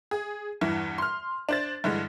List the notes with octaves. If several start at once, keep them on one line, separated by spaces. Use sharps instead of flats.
G#4
E2 G2 E3
C6 F6
D4 C5 A6
G2 D3 E3 G#3